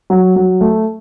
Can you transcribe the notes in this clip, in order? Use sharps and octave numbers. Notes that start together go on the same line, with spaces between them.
F#3
F#3
A3